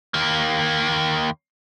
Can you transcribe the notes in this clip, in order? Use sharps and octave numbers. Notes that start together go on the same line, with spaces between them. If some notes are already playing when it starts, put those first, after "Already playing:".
D#2 A#3